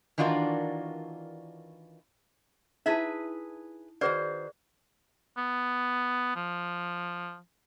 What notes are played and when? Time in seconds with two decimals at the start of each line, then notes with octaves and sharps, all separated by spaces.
0.18 D#3 E3 D4 F4 F#4 A#4
2.86 D#4 E4 G#4 B4 E5 A5
4.01 D#3 F#4 G#4 B4 C5 D5
5.37 B3
6.36 F3